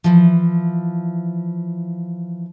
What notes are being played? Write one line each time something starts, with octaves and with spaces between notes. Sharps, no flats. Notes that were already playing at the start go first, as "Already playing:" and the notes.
E3 F3